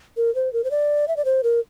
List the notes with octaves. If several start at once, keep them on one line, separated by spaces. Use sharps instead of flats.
A#4
C5
A#4
C5
D5
E5
D5
C5
A#4